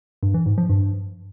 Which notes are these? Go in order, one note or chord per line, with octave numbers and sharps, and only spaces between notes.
G2
E3
G#2
F3
G2